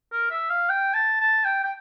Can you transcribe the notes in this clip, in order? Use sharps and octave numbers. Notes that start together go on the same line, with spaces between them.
A#4
E5
F5
G5
A5
A5
G5
G5